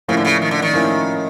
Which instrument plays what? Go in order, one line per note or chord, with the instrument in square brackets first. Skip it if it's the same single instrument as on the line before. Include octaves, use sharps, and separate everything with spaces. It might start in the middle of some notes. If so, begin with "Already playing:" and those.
[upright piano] A2 F3 A#3 C#4 E4 [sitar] C#3
[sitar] D3
C#3
D#3
D3
D#3
[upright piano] A2 F3 A#3 C#4 E4